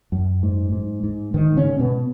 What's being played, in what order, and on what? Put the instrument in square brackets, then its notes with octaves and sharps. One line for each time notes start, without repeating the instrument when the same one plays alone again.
[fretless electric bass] F#2
G#2
G#2
G#2
G#2 D#3
C#3 C#4
G#2
B2 B3